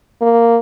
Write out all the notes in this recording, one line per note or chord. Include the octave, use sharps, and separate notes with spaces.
A#3